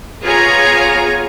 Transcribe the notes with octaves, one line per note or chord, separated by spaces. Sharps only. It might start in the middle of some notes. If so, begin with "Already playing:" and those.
B3 F4 G#4 C#5 G#5 A#5